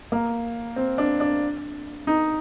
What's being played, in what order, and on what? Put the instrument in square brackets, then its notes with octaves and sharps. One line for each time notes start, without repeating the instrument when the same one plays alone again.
[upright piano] A#3
C4
D4
D4
D#4